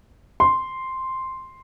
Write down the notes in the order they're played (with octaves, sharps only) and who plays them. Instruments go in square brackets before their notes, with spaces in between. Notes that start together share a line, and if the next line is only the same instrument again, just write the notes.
[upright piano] C6